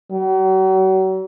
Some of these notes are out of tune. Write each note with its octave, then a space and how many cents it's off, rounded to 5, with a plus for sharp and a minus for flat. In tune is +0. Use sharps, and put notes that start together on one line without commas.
F#3 +40